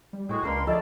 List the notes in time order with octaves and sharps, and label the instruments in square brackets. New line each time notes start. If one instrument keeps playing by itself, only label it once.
[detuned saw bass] G3
[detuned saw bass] A2 [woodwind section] G#3 F#4 G#4 [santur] G5 C#6
[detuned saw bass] C#2 [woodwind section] B2 A#3 C6 [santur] D4 A#4 B5
[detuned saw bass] F3 [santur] A3 A4 [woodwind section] G#4 D5 [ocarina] D#5